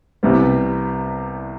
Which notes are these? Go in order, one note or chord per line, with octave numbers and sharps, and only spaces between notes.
C2 C3 G3 B3